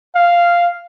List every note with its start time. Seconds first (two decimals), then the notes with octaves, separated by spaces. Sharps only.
0.15 F5